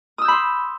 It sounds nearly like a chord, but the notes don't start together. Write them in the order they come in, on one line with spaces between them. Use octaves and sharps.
D#6 E6 G6 B5 C6